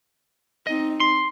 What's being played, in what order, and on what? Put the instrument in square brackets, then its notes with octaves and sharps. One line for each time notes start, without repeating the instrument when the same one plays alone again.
[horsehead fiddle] C4 D#4 [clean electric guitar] D#5
[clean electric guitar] C6